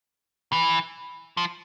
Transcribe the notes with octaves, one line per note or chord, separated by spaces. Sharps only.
E3
F3